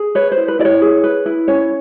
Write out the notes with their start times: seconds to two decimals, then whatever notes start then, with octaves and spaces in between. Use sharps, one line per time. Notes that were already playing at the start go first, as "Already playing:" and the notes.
Already playing: G#4
0.15 B4 C#5
0.32 C5
0.37 E4
0.48 B4
0.59 E4 D5
0.65 C#5
0.82 G#4
1.04 B4
1.26 E4
1.48 C#4 C#5